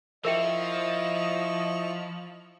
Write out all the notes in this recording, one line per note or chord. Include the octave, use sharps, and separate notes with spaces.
F3 E4 A#4 D#5 E5 G5 C#6